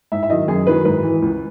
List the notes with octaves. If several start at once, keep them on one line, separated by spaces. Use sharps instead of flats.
G#2 E5
E5
D#3 F#3 D#5
F#2 G#4
D#3 F#3 B4
G#2 B4
E3
C#2